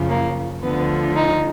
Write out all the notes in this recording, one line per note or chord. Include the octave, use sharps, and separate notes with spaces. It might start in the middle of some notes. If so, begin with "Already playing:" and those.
Already playing: F#2 C#3 F3
A#3
D2 D3 F3 B3
D#4